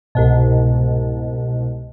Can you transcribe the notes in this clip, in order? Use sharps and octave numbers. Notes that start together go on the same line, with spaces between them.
C2 G#2 B2